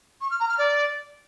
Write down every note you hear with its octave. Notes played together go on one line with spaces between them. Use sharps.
C#6
F6
A#5
F6
D5